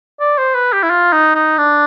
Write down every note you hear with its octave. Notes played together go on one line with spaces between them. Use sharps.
D5
C5
B4
G4
E4
F4
D#4
D#4
D4